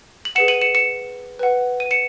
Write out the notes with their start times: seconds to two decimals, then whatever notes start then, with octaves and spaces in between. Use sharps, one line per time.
0.25 F#7
0.35 G#4 B4 F#5 C#7 E7
0.48 D#7 F#7
0.61 C#7 E7
0.75 C#7 E7
1.39 B4 F#5
1.80 D#7
1.91 C#7 E7